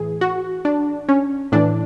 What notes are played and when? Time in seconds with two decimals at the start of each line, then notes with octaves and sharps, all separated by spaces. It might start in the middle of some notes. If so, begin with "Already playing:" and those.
Already playing: A2 E3 G#4
0.21 F#4
0.65 D4
1.09 C#4
1.52 A2 E3 D4